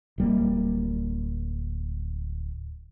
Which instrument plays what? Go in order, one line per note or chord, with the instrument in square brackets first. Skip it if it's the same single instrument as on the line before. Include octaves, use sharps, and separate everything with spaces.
[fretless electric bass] D1 G3 A#3